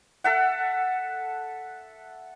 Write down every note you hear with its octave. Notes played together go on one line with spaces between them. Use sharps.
A4 E5 F#5